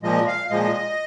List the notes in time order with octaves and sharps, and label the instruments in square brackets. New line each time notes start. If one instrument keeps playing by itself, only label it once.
[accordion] A#2 F3 G#3 D#5
F5
A#2 F3 G#3 D#5